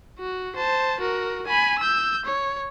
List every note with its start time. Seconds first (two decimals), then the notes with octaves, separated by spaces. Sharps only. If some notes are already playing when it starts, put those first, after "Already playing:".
0.19 F#4
0.56 C5 A5
1.00 F#4 A#4
1.47 G#5 B5
1.79 E6 G6
2.26 C#5